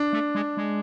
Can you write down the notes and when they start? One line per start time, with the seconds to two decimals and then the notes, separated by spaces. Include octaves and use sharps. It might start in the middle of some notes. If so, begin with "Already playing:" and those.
Already playing: D4
0.13 A3
0.35 G#3
0.57 G#3